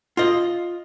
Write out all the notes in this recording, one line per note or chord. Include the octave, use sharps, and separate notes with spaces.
F4 D#5